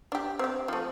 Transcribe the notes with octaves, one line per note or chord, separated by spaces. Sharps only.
D4 G4
C4 G4
F3 A3